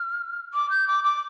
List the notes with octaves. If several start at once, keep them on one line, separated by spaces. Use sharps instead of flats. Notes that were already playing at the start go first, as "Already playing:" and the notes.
Already playing: F6
D6
G6
D6
D6